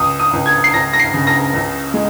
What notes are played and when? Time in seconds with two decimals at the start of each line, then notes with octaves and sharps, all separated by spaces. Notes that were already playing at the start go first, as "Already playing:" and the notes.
Already playing: C#2 D#6
0.19 D#6
0.33 C#2
0.46 G#6
0.64 C7
0.74 C#2 A#6
0.93 A#6
1.00 C7
1.14 C#3
1.27 A#6
1.54 C#2
1.94 G#3